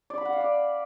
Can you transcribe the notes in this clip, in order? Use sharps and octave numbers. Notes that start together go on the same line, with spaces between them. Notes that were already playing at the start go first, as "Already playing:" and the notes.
D5
B5
F#5
F5
D5